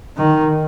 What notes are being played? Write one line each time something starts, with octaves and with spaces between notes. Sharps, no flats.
D#3